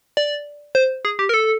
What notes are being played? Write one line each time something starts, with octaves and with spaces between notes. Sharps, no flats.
D5
C5
G#4
G4
A#4
A4